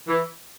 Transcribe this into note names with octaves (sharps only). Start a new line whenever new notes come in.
E3